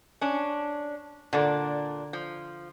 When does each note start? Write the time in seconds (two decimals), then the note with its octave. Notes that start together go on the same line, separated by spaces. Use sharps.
0.21 C#4 D4
1.33 A#2 D3 D4 D5
2.13 F3